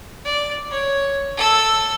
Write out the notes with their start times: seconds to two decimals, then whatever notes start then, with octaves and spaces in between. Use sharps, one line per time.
0.25 D5
0.71 C#5
1.37 A4 E6